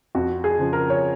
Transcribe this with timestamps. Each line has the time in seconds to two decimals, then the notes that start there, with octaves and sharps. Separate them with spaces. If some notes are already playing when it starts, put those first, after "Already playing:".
0.15 F2 F#4
0.44 G#4
0.58 C#3 F3
0.73 A#4
0.90 C#5